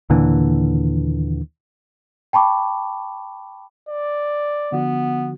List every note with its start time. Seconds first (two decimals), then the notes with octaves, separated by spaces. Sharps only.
0.10 D#2 A#2 D3 E3
2.33 G5 A5 B5 C#6 D6
3.89 D5
4.72 D3 F3 B3 F#4